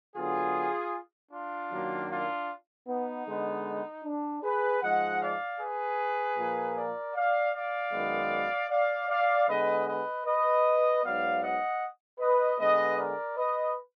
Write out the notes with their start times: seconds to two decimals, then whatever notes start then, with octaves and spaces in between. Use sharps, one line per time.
0.15 D3 F#3 B3 F4 G#4
1.32 D4 F4
1.71 F#2 D#3 F#3 A#3
2.10 D4 F4
2.88 B3 D#4
3.26 D3 G#3 B3
4.04 D4
4.43 G#4 B4
4.82 G#2 F3 G#3 D#5 F#5
5.21 D5 F5
5.60 G#4 B4
6.37 A#2 F3 A#3
6.76 A#4 D5
7.15 D5 F5
7.53 D5 F5
7.93 F#2 D#3 G#3 B3
8.70 D5 F5
9.09 D5 F5
9.48 D3 G#3 B3 B4 D#5
9.87 B4 D#5
10.26 B4 D#5
11.03 G#2 F#3 B3 D5 F5
11.42 D#5 F#5
12.20 B4 D#5
12.59 D3 G#3 B3 B4 D#5
12.98 A#4 D5
13.37 B4 D#5